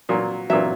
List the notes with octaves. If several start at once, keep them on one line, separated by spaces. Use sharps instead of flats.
A#2 F#3
A#2 F#3 E5